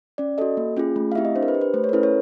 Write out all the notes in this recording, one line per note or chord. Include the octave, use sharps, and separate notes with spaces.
C#4 D5
F#4 A4 D#5
A#3
C#4 F4 G#4
A3
F5
C4 E4 G4 E5
D#5
D4 C5
A#4
B4
G4
B4
A3 C5
C#5
A#4
C#4 E4 A4 B4
C#5